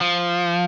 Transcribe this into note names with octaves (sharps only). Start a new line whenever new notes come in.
F3